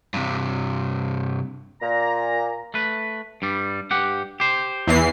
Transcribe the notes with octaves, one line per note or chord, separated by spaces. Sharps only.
G2 C3
A#2 A#5
A3 B4
G2 G3
G2 G4 F#5
G4 C5
E2 E3 C7